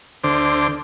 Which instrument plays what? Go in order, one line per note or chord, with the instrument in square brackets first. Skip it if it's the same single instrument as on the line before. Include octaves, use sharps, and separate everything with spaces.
[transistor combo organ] D2 D3 C5 D6